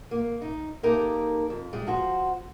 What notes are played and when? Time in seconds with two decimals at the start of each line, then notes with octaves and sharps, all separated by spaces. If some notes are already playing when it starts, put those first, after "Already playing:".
0.11 A#3
0.42 D#4
0.83 A#3 D#4 G4 A4 A#4
1.50 F2
1.73 G3 G#3
1.87 F3 F#4 C5